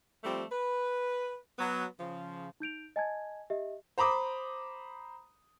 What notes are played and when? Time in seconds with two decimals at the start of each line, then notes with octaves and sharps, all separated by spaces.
0.23 F3 G3 A3 C4
0.51 B4
1.59 F#3 B3
1.99 C#3 F3
2.60 D#4 G6 D7 F7
2.96 D#5 G#5 A5 G#6
3.50 G4 D#5 E5
3.98 C5 A#5 B5 D6 D#6